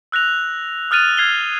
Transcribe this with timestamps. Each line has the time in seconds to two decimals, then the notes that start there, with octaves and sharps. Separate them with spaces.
0.12 E6 F#6 A#6 F7
0.91 D#6 F6 F#6 A6 D#7 F7
1.17 F6 G#6 C7 F7 G7